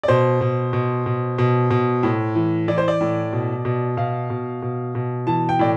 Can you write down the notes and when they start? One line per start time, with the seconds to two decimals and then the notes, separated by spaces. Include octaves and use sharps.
0.03 D5
0.08 B2 C5
0.41 B2
0.73 B2
1.06 B2
1.38 B2
1.70 B2
2.03 A2
2.35 E3
2.68 E3 D5
2.78 C5
2.88 D5
3.01 A2
3.33 B2
3.65 B2
3.97 B2 F5
4.30 B2
4.62 B2
4.95 B2
5.27 E3 A5
5.49 G5
5.59 A2 D5